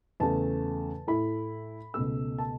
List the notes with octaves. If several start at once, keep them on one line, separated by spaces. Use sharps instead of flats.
E2 C#3 A3 A5
A2 A3 E4 B5
C#2 B2 A3 E6
A5